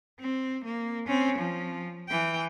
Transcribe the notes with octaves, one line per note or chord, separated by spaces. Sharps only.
C4
A#3
C4 C#4
F3
E3 G5